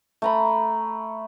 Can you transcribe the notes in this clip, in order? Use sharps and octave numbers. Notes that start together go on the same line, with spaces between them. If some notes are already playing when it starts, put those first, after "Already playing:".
A3 A#5 B5